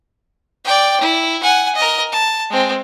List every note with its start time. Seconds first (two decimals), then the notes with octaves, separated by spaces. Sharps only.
0.65 D5 G5
1.01 E4
1.43 F#5 G#5
1.76 A#4 D#5
2.12 A5
2.50 G#3 C4